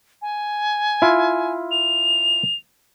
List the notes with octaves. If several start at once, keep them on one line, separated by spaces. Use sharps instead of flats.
G#5
E4 F4
F7